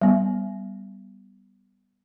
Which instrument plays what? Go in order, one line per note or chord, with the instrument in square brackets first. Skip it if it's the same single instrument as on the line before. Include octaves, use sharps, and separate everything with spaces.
[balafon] G3 B3